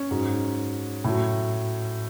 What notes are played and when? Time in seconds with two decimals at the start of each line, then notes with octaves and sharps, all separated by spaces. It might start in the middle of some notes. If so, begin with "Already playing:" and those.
Already playing: C#4 C#5
0.11 G#2 F#3
1.04 A2 F#3